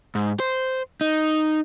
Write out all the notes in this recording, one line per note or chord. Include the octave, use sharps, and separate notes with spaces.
G#2
C5
D#4